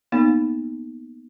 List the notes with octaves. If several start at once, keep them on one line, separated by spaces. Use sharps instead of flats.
A#3 B3 D#4